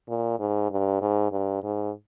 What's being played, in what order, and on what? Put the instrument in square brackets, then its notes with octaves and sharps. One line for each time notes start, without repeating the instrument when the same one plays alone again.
[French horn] A#2
G#2
G2
G#2
G2
G#2